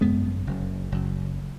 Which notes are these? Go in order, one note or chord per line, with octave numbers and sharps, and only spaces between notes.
G#1 F#2 C#3 G#3 B3
F#1 F#2 C#3
F#1 F#2 C#3